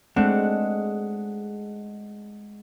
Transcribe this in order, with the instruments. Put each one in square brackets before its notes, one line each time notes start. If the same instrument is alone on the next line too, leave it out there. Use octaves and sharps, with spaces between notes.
[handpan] G#3 F#5 [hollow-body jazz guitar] A3 C4 D4